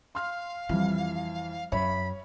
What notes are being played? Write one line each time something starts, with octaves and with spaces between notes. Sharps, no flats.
F5 C6 F6
F2 E3 G3
F#2 C#5 E5 B5